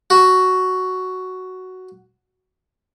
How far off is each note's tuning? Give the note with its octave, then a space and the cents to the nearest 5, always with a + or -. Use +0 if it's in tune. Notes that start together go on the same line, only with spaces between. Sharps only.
F#4 +5